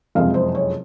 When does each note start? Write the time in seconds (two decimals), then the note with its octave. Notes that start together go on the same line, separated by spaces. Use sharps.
0.15 F#1 F2 C3 F3 G#3 F5
0.34 C5
0.55 C#5